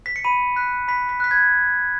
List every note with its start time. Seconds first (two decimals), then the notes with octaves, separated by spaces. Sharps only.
0.06 B6
0.16 C#7
0.24 B5 D#7
0.56 F#6 B6
0.88 B5 B6
1.09 B6
1.20 F#6 B6
1.31 G#6